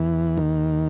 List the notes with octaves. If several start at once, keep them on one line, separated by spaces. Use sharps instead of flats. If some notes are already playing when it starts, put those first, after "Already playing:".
Already playing: E2 E3
D#2 D#3